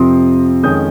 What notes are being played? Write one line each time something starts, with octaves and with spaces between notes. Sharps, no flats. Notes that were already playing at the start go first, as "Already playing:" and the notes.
Already playing: F2 C3 F3 C4 C6 D#6
F2 D#3 G#3 C#4 D#6 G6